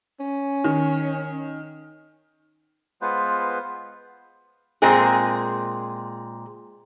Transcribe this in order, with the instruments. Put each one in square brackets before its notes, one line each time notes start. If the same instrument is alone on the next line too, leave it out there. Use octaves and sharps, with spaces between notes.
[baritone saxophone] C#4
[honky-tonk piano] D#3
[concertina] G#3 B3 F4 B4 C5
[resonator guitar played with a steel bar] A#2 G#3 C4 G#4